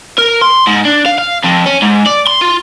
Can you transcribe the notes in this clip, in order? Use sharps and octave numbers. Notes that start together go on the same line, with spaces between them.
A#4
C6
G#2
D4
F5
F5
F2
C#4
G#2
D5
C6
F4